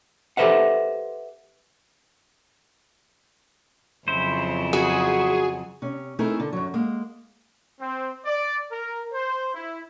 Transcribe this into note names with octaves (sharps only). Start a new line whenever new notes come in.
G4 A4 B4 C5 E5 F#5
F2 C#3 F#3 E4 C5
F#4 G#4
C3 C#4
A3 C4 D#4 E4 G#4 A#4
D3
F#2 F#3
G#3 A#3
C4
D5
A#4
C5
E4